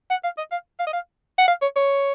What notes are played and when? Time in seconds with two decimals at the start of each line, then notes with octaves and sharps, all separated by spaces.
0.10 F#5
0.24 F5
0.38 D#5
0.52 F5
0.80 F5
0.87 D#5
0.93 F5
1.38 F#5
1.48 F5
1.62 C#5
1.76 C#5